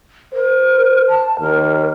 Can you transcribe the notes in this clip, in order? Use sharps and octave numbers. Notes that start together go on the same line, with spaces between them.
A#4 C5
A5
D#2 A#4